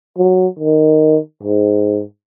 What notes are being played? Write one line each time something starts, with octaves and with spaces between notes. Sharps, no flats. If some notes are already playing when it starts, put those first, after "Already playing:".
F#3
D#3
G#2